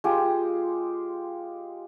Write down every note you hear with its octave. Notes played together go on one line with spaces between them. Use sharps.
G#3 F4 G4